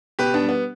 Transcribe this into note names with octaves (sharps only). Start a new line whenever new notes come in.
B2 G4 B4
B3 D4
G3
B3